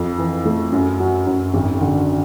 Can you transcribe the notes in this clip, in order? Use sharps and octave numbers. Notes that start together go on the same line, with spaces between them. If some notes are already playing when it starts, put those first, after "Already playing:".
Already playing: F2
E3
A3
F#2
F#3
F#2
G#1
D3